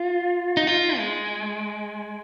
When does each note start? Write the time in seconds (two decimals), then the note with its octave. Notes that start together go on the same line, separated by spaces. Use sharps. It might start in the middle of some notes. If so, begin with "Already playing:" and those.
Already playing: F4
0.57 D#4
0.67 F4
0.98 G#3